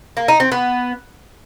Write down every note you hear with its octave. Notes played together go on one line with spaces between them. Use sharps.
A#3
D#4
C4
B3